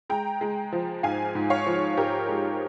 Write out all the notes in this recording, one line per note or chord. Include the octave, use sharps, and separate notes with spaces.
G#3 G5 A#5
G#3
F3
G#2 F5 G#5
G#2
C#5 F5
F3
G#2 G4 A#4
G#3